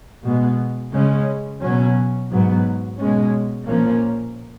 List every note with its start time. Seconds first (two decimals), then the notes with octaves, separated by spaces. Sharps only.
0.22 B2 G#3 B3
0.92 C#3 G#3 C#4
1.60 B2 F#3 C#4
2.30 G#2 F#3 B3
2.98 B2 G#3 C#4
3.66 A#2 F3 A#3 C#4